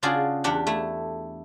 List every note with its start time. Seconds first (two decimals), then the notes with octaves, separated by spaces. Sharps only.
0.03 C#3 D4 F4 F#4 G#4 D5
0.44 E2 D4 G4 F#5
0.67 A3 E4